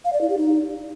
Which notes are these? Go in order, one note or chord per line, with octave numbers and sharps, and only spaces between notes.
F5
D5
E4
G4
D#4